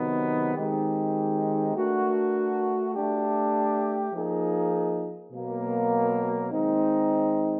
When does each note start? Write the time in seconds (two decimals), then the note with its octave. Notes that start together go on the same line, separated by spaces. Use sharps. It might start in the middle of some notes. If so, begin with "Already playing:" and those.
Already playing: C3 D#3 F#3 B3 D#4
0.55 D#3 G#3 C4 D#4 G4
1.74 A3 D4 F#4 A#4
2.94 A3 D4 G4
4.12 F3 A#3 D#4 G#4
5.32 B2 F#3 A#3
6.51 D#3 G#3 C4 D#4